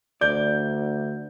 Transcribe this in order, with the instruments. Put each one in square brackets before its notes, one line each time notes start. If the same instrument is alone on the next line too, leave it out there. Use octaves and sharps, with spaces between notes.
[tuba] D2 [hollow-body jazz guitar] D5 [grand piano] G6